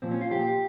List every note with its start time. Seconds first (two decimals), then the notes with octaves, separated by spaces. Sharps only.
0.02 A#2 F3 C4
0.11 C#4
0.21 F4
0.31 A#2 F3 G4